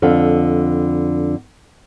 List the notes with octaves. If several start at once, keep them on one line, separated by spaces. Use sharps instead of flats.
F2 D3